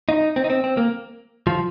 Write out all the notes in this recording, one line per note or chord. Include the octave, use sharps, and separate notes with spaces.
D#4
C4
D#4
C4
C4
A#3
F3